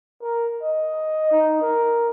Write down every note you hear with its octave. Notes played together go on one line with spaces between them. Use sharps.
A#4
D#5
D#4
A#4